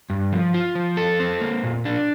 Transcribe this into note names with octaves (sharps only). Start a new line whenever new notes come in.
G2
F3
F4
F3
A4
C4
A#3
A#2
D4